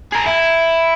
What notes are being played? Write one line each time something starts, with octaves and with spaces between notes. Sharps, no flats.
G#4 A#4
E4